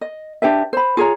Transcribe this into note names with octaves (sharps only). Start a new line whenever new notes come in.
D#5
D4 G4 B4 E5
C5 B5
F4 G#4 C#5 A#5